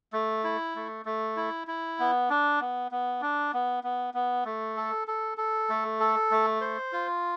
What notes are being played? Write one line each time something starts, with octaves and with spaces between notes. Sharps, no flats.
A3
E4
A3
A3
E4
E4
B3
D4
B3
B3
D4
B3
B3
B3
A3
A4
A4
A4
A3
A4
A3
C5
F4